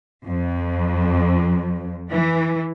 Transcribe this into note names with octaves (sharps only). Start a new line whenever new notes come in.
F2
E3